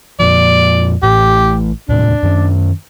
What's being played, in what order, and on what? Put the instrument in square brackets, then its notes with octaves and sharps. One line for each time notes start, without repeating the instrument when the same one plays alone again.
[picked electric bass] F2 A#2 F3 [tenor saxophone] D5
[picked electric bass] A1 A2 [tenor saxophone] G4
[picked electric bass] D#1 A2 C3 [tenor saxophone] D4
[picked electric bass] F#2 D#3 C#4